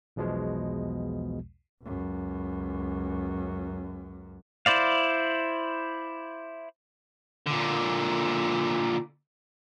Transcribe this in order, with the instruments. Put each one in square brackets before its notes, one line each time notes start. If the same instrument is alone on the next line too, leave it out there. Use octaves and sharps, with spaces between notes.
[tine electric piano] B1 E2 B2 F3 G#3
[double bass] C#2 F#2
[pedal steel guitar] E4 C5 D5 F5
[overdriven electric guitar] A#2 D3